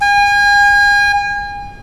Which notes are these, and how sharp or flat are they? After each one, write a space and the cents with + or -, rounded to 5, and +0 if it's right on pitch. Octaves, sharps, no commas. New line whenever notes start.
G#5 -35